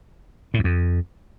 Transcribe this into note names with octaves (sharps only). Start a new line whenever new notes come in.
A2
E2
F2